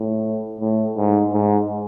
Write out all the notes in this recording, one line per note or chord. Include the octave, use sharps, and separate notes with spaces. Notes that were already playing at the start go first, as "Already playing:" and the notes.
Already playing: A2
A2
G#2
G#2